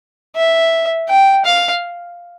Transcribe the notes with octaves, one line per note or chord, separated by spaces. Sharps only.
E5
G5
F5